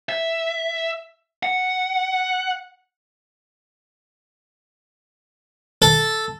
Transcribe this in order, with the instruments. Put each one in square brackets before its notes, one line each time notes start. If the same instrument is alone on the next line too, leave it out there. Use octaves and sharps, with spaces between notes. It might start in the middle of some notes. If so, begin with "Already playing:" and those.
[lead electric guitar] E5
F#5
[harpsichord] A4